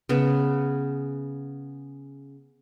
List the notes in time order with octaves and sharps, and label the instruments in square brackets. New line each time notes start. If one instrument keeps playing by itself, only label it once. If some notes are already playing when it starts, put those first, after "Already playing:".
[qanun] C#3 B3